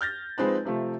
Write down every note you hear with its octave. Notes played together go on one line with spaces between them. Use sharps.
F6 G6 A6 A#6
F3 G#3 C4 D#4 B4
C3 F3 A3